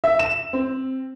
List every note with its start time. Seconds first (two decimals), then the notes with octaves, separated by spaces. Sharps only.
0.04 E5
0.19 E7
0.53 C4